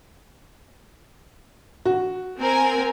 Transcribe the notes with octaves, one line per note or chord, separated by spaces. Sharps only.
F#4
C4 A#4 G#5